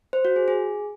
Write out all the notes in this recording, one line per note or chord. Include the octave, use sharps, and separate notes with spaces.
C5
F#4
G#4
G#4